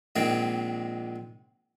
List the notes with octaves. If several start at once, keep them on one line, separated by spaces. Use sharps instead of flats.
A#1 A#2 D#3 G#3 C4